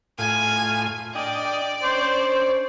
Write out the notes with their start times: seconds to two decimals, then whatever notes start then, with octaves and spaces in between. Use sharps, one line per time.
0.19 A2 F4 G#5
1.15 D4 D5 D#5 G5
1.83 C#4 D4 C5